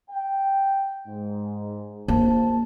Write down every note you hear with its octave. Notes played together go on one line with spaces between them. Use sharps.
G5
G#2
A#1 A#3 C5 A5